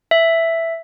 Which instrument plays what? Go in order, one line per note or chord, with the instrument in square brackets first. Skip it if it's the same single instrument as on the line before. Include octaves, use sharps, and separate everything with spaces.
[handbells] E5